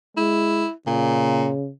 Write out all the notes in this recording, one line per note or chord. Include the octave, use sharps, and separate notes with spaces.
G#3 E4
A#2 C#3